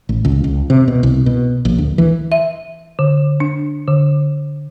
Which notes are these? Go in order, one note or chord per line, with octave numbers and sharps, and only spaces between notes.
A1
C#2
C#2
C3
B2
C2
B2
A#1
D2
E3
E5
D3
D4
D3